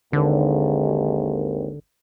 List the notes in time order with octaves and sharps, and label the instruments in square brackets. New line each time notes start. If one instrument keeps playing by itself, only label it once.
[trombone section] G#1 D#2 [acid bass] D3